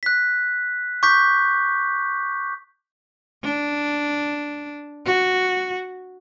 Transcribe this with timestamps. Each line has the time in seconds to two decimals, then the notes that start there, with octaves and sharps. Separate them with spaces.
0.03 F#6 B6
1.03 C#6 D6 G6 B6
3.43 D4
5.05 F#4